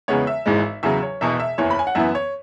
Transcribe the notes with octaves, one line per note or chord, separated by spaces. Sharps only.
E2 C#3 G#3 B3 C#5
E5
G#1 G#2 E3 G#3
E2 C#3 F#3 E5
C#5
E1 E2 B2 E5
E5
F#1 E2 E3 C#5
B5
G#5
F#5
F#2 E3 B3 E5
C#5